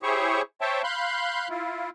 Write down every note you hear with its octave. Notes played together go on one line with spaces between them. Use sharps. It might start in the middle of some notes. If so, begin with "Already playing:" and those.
E4 G4 G#4 C5 C#5 C#6
C5 C#5 E5 G5 A5
F5 B5 C6 F#6 G6
E4 F4